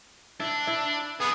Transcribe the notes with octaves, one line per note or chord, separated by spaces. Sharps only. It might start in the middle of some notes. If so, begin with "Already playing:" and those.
D4 E4
E4
B3 G#4 B4